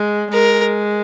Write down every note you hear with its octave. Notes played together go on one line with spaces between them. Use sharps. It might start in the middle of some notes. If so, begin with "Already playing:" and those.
Already playing: G#3
G#3 A#4